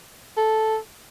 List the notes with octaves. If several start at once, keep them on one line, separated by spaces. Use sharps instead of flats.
A4